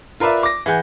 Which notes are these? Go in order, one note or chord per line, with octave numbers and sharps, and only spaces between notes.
F4 A#4 B4 D5 E5
D6 A#6
E3 G#4 F#5 G6